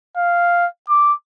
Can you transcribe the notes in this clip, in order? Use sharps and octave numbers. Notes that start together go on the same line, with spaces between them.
F5
D6